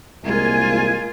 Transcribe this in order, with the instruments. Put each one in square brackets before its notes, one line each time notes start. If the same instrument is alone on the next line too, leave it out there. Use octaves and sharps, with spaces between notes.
[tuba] C2 [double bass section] G#3 A#3 [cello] F4 [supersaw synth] G#5